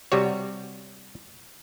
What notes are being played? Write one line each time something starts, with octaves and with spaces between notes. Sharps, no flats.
C3 G3 F#4 C#5